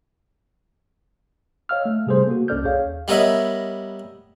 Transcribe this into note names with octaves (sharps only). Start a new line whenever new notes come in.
C#5 D#5 F5 E6 F6
A3
C3 G3 G#4 A4 C5
A#3 F#4
C2 C#4 A4 D5 F6 G6
D#2 G#4 C#5 F5
G3 B3 A#4 C#5 D#5 E5